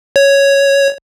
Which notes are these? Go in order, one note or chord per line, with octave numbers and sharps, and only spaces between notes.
C#5